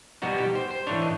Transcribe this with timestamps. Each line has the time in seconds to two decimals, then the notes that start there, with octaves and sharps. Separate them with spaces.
0.22 B2 G3 B3 D#4 F#4
0.38 G4
0.55 C5
0.71 C5
0.87 A2 E3 A3 D4 C#5
1.02 D#5